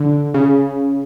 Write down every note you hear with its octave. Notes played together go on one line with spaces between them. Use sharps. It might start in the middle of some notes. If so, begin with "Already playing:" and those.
Already playing: D3
C#3